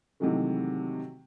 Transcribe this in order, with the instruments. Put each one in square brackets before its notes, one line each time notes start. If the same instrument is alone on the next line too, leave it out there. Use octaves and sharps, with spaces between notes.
[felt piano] C3 D#3 E3 F#3 G#3 A3